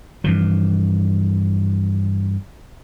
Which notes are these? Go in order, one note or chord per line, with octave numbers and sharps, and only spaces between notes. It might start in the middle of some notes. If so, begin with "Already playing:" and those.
G2 E3 F3